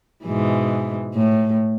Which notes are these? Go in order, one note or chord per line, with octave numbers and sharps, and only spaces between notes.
G#2 B2 E3
A2